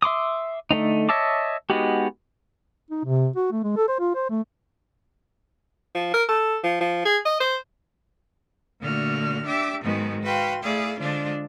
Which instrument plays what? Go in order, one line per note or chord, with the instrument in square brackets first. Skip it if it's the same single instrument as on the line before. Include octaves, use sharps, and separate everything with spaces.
[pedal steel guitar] E5 C6 D6 D#6
D3 A3 C4 D#4
C#5 D#5 E5 A5 D6
G#3 B3 D#4 F#4 G4
[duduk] D#4
C3
F#4
A3
G#3
A4
C5
F4
C5
A3
[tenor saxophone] F3
A#4
A4
F3
F3
G#4
D#5
C5
[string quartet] A#2 D3 A3 F#4 F6
D4 G4 E5 D6 E6
G#2 D#3 F#3 G#3 B3 F#4
F#4 B4 F5 G5 C6
A3 E4 G#4 D5 F5
D3 F3 G#3 D4 F4